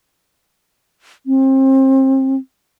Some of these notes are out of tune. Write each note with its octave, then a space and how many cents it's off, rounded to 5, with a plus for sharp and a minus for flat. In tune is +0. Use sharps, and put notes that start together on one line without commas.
C4 +30